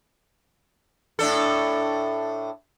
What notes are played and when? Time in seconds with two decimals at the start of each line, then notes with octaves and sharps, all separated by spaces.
1.19 A2 D4 A4